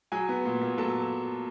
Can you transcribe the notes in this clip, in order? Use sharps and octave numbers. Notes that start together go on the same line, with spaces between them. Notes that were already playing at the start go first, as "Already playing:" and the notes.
F#3 G#4 G#5
B3
A#2
A#2
F#3 A4 A5